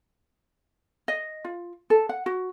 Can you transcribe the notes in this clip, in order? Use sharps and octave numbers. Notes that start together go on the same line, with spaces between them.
D#5
F4
A4
F#5
F#4